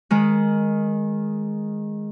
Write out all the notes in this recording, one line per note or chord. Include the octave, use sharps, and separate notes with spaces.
D#3 G#3